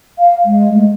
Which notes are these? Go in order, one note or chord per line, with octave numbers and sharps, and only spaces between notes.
F5
G#3
A3